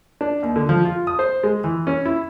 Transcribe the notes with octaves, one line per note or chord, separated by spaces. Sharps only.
D4
D#2
D3
F3
F4
D#6
C5
G#3
E3
C#4
E4